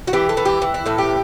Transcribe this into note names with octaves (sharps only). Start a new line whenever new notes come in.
F#4
E3 G4
A4
E3
G4
E3
E4
A2 A4
G4